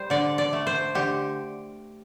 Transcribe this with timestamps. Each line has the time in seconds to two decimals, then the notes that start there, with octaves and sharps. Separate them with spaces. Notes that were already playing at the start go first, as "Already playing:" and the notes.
Already playing: G3 C5
0.10 D3 D5
0.38 D5
0.53 A3
0.67 C5
0.95 D3 G4